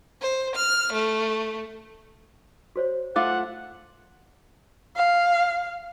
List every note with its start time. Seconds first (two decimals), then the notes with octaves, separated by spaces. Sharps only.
0.22 C5
0.56 F6
0.93 A3
2.76 F#4 C5 C#5
3.16 A3 F4 F5 F#5 D6
4.96 F5